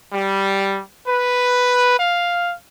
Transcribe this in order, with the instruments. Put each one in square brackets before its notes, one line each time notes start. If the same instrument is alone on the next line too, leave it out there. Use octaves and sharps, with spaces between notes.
[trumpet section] G3
B4
F5